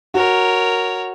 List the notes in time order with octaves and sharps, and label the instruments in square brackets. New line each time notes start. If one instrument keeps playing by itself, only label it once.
[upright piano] F#4 [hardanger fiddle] A#4 C#5